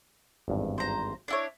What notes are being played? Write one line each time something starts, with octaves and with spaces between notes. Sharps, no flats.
G#1 E2 G2
C5 A#5
D4 E4 C#5